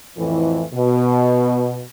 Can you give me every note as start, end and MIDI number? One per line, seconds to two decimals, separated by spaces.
0.18 0.63 41
0.18 0.63 45
0.18 0.63 52
0.74 1.83 47